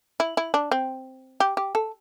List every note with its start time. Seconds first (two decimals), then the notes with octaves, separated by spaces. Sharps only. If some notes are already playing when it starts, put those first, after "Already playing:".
0.20 E4
0.37 E4
0.54 D4
0.71 C4
1.40 G4
1.57 G4
1.75 A4